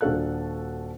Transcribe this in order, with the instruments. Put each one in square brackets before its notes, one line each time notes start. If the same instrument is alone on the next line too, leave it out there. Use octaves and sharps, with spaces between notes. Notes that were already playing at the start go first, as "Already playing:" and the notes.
[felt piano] D#1 D4 F#4 A4 F5 F#6